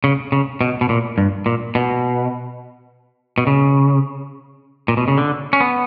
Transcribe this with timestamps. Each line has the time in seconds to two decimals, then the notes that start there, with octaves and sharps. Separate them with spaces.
0.04 C#3
0.32 C#3
0.61 B2
0.81 B2
0.89 A#2
1.18 G2
1.46 A#2
1.75 B2
3.38 B2
3.47 C#3
4.88 A#2
4.97 B2
5.08 C#3
5.18 D3
5.53 C#4
5.61 B3